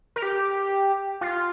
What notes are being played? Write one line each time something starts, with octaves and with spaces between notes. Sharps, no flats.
A#4
G4
F4